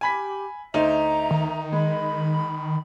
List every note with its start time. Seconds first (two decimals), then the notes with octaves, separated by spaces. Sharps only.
0.01 G4 G#5 B5 B6
0.74 D2 D#4 C5 E5 A#5
1.31 D#3
1.73 D#3 G#3 B5